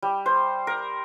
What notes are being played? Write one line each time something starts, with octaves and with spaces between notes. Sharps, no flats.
G3
C5
A#4